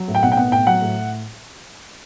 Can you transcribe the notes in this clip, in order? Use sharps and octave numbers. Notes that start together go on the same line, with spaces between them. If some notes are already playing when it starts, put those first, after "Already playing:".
Already playing: F#3
A2
G5
B1 F#5
G5
B3 F#5
A2 G5
F#3 F#5
A2